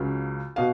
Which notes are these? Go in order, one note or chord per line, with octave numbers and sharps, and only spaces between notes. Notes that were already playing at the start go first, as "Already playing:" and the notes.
Already playing: C#2 C#3 F#3
B2 F5